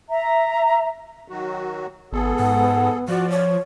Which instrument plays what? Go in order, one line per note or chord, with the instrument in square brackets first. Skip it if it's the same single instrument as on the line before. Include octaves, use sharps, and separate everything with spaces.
[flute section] E5 A#5
[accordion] D#3 F#3 F#4
[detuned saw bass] G#1 [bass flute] B3 [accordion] G#4 A4
[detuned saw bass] G#2 [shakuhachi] F#5
[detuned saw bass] F3 [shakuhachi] F#4 [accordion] D5
[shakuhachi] C#5